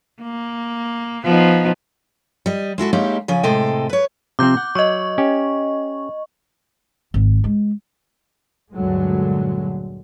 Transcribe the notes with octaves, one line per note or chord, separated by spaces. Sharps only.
A#3
F3 B3 D#4
G3 D#5
G#3 E4 F#4 A4
G#3 A#3 C#4 D#4 E4 G4
C#3 F3 C#4 G#5
A2 C3 G#3 A4 D#5 G5
B4 C#5
C3 F3 C4 D6 G6
F#5
F#3 D#5 C#6
C#4 G4
G#1
G#3
D2 G2 A#2 D3 F#3 G#3